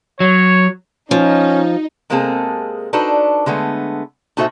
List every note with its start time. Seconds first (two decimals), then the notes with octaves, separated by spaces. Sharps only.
0.20 F#3 C#5
1.11 F3 C#4 D#4
2.10 C3 G#3 A#3 C4 G#4 A4
2.93 D4 D#4 F#4 A4 B4 C5
3.46 D3 G#3 A3 B3
4.37 A#2 D#4 F#4 A4 C5 E5